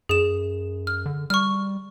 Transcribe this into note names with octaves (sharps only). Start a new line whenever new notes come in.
F#2 G#4 E7
F6
D3
G3 C#6 F6